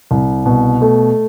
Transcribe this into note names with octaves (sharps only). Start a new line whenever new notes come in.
C2
B2
A3